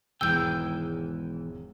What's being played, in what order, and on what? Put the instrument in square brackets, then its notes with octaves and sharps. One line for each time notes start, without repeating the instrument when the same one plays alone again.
[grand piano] E1 G#2 D#3 [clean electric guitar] E2 E3 G5 [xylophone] E6 G6